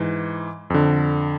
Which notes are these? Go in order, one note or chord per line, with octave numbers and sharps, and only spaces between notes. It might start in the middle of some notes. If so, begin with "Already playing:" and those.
Already playing: G#2 E3
F2 D3